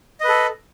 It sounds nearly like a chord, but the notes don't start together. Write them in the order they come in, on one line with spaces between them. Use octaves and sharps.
D#5 B4 A4